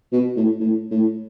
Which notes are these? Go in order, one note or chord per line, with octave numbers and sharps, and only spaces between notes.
B2
A2
A2
A2